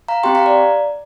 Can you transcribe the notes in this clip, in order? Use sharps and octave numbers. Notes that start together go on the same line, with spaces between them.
F5 A#5
C4 G4 G5 C6
F5 A#5
D5